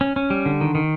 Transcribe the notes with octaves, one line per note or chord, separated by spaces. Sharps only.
C#4
C#4
G3
D3
D#3
D#3